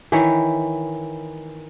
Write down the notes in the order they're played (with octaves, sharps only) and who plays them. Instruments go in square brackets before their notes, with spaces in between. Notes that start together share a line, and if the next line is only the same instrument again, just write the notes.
[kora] D#3 E3 E4 C#5